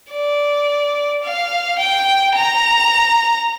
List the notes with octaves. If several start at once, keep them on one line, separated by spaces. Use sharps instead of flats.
D5
F5
G5
A#5